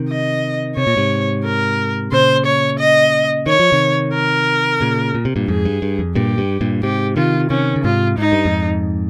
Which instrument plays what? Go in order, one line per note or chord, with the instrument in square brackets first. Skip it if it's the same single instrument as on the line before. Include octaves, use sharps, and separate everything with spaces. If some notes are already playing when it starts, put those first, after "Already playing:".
Already playing: [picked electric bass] C3 D#3
[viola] D#5
[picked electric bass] C3 [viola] C#5
[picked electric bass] A#2
G#2 C3
[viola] A#4
[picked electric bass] A#2 C#3 [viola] C5
[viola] C#5
D#5
[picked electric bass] D#3 [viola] C#5
[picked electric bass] F3
C3 D#3
[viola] A#4
[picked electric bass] A#2 C#3
A#2
C3
G2 A#2
[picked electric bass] F2 G#2 [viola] G#4
[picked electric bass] G2
G2
F2
[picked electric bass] G2 A#2 [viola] G4
[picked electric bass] G2
G2 A#2
[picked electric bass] G#2 C3 [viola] G4
[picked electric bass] C3 D#3 [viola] F4
[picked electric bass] C3 D#3 [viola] C#4
[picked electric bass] C#3
[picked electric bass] G#2 C3 [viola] F4
[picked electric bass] G#2 [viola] D#4
[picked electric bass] G2
F2 G#2